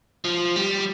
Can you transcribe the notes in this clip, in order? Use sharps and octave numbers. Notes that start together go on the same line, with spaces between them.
F3
G3